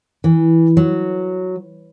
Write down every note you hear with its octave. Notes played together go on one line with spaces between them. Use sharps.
E3
F#3